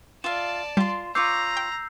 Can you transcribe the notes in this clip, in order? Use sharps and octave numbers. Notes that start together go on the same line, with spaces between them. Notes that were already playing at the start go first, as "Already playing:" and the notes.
F4 D5 E5 F5 A5 E7
G3 F4 C6
F4 C#5 A#5 D6 E6 G6 C7
G5